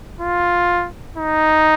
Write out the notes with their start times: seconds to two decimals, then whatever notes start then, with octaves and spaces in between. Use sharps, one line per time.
0.21 F4
1.17 D#4